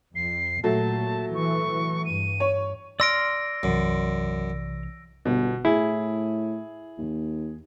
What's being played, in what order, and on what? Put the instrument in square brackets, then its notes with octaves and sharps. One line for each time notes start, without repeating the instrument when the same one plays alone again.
[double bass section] F2 [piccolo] C7
[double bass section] A#2 [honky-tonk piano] F#3 A3 [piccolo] A5
[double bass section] E3 [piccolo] C#6
[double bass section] G2 [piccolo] D#7
[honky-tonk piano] C#5
[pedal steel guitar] D5 C6 F6 [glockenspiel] E6 A#6 D7
[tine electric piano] B1 C3 E3 [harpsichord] F#2
[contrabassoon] G1 [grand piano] B2
[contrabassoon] A2 [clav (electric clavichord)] E4 [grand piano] G#4
[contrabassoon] D#2